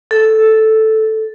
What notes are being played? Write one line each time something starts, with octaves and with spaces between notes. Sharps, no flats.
A4